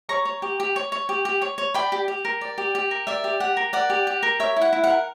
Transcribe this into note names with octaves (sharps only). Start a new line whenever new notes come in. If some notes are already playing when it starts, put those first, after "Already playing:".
C#5 A#5 C#6
C#5
G4
G4
C#5
C#5
G4
G4
C#5
C#5
D5 G5 B5
G4
G4
A#4
D5
G4
G4
A#4
D5 E5
G4
G4 F#5
A#4
D5 F#5
G4
G4
A#4
C#5 E5
E4
F#5
E4
F#5
A#4